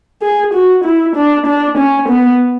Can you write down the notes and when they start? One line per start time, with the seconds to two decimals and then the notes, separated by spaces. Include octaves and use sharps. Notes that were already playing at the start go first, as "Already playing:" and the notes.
0.22 G#4
0.54 F#4
0.84 E4
1.16 D4
1.46 D4
1.78 C#4
2.08 B3